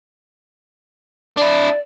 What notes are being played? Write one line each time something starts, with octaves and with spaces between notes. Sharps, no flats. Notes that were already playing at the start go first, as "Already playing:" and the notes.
D4 E4 D5